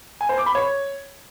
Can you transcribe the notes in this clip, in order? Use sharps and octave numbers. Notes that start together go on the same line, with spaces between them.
G#5
C5
D6
B5
C#5